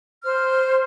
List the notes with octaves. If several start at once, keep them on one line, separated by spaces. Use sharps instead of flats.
C5 F6